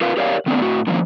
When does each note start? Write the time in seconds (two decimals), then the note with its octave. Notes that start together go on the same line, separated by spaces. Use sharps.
0.01 F4 A#4 B4 F5
0.17 G4 A#4 C#5 D5 F5
0.46 D#3 A3 B3 C4 D4
0.60 A2 F#4
0.87 D3 D#3 F3 A#3 C#4